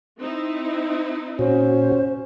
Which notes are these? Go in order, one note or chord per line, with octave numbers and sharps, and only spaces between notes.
C4 D#4 E4
A#2 C#4 F#4 C5